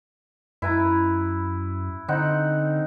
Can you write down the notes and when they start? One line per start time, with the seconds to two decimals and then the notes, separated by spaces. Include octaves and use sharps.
0.62 F#2 E4 B4 A#5
2.08 D3 C4 D#4 F#5